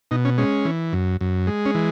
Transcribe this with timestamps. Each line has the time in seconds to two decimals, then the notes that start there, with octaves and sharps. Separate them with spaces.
0.11 B2 D#4
0.25 C#4
0.38 G#3 C#4
0.65 E3
0.93 F#2
1.21 F#2
1.47 G#3
1.65 C#4
1.75 E3